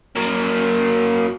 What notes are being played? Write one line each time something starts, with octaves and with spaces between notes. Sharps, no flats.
F#3 A#3